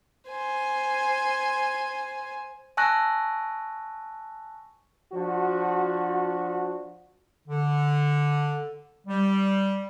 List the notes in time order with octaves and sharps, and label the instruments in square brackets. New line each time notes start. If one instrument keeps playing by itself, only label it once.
[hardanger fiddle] C5 G#5
[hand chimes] G#5 A5 C#6 E6 F#6 A#6
[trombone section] F3 D4 F#4
[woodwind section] D3
G3